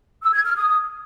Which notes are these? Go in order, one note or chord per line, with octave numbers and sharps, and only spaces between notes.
E6
G#6
F6
D#6